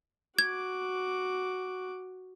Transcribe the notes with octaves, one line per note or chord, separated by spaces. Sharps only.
F#4 D6 G#6